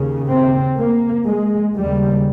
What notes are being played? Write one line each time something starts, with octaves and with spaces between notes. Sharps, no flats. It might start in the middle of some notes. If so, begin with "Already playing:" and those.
Already playing: D#2 C#3
C4
A#3
G#3
D#2 C#3 G3